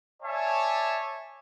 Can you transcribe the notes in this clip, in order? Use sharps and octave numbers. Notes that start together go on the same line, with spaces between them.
C#5 D5 E5 G#5 A5